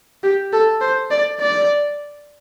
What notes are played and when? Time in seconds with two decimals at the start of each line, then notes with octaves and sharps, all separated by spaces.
0.23 G4
0.53 A4
0.81 C5
1.11 D5
1.40 D5